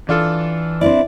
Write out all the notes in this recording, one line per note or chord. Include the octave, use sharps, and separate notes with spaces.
E3 D4 F4 A4
C4 D4 E4 D5